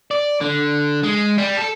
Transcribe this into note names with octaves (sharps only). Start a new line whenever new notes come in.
D5
D3
G#3
G3
A4